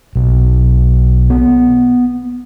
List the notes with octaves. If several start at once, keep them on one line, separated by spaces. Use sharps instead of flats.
B1
B3